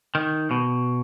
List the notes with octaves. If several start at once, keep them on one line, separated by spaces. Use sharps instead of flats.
D#3
B2